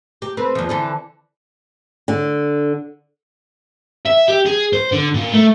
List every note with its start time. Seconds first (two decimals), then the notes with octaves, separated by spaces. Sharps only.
0.22 G4
0.37 C4 A4 B4
0.55 E2 F3
0.69 D3 E3 A4
2.08 D3
4.06 E5
4.28 G4
4.46 G#4
4.73 C5
4.92 D3
5.15 A#2
5.33 A3